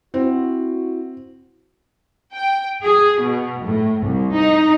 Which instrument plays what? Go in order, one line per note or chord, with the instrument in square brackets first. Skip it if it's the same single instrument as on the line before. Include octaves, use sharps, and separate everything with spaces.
[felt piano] C4 [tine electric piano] E4 [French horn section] F#4
[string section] G5
G#4
B2
A2
C2
D#4